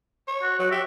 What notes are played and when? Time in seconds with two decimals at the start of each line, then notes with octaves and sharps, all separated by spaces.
0.28 C#5
0.43 F#4
0.59 F#3
0.72 G4 E5